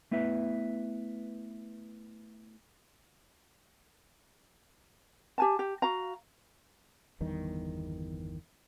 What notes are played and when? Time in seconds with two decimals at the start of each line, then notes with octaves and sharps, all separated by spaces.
0.11 A3 B3 E4 B4 E5
5.38 G4 G#5 A5
5.59 G4
5.82 F#4 F5 A#5
7.21 G1 E2 G2 D#3